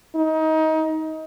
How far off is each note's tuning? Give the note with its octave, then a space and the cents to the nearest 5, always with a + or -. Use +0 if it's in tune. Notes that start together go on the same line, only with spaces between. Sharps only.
D#4 +25